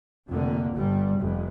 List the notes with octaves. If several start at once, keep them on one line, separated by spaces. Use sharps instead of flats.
F1 F2 D3 A#3
G1 G2 G3
F1 F2